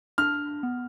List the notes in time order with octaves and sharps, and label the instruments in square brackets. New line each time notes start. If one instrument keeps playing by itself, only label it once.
[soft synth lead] D4 [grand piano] F6
[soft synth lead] B3